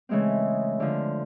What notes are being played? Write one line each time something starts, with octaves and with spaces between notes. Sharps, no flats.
C#3 E3 G#3 A3 C4
D3 F3